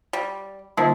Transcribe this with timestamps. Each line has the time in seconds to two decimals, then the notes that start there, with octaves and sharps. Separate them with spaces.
0.13 G3
0.77 D3 F3 G3 A#3 D#4